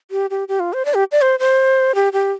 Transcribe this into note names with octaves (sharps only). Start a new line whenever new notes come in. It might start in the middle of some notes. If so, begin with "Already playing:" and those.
G4
G4
G4
F4
C5
D5
G4
D5
C5
C5
G4
G4